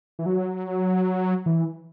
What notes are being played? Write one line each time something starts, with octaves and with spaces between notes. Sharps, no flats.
E3
F#3
E3